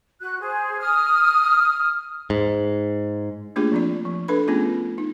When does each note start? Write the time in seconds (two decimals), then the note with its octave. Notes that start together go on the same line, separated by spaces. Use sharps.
0.20 F#4 F#6
0.39 G#4 C5
0.79 D#6 F6
2.30 G#2
3.56 A3 A#3 D4 F4 G4 G#4
3.72 F3 C4 D5
4.05 F3
4.28 D4 A4 B4 B5
4.47 A3 B3 C#4 F4 G#4
4.98 D#4